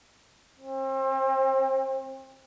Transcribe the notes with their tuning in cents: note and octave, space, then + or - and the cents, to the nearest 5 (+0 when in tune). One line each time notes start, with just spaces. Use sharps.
C4 +35